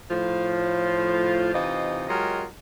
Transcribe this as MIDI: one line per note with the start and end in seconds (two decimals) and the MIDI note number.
0.11 1.51 45
0.11 1.51 53
0.11 1.51 65
1.54 2.05 48
1.54 2.05 52
1.54 2.05 63
1.54 2.05 65
1.54 2.05 72
1.54 2.05 75
2.09 2.45 54
2.09 2.45 56
2.09 2.45 65
2.09 2.45 67
2.09 2.45 70
2.09 2.45 75